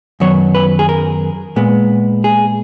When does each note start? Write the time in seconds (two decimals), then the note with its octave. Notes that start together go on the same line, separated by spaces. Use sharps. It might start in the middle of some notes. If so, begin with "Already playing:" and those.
0.20 F#2 D#3 F#3 B3 C#5
0.55 B4
0.79 G#4
0.89 A#4
1.56 A#2 G#3 B3
2.24 G#4